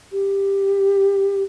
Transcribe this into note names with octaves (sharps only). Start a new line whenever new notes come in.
G4